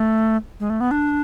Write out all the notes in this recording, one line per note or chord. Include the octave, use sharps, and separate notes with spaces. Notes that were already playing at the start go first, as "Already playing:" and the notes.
Already playing: A3
G#3
A3
B3
D4